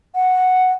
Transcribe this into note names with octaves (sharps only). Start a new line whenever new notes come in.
F#5